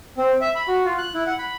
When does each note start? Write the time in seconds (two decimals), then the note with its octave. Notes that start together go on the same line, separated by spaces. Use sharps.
0.18 C4
0.41 E5
0.55 B5
0.68 F#4
0.85 F4
0.98 F#6
1.14 E4
1.27 F#5
1.39 B5